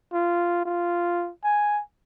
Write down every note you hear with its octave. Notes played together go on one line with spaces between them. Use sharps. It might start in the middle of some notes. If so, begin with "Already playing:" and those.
F4
F4
G#5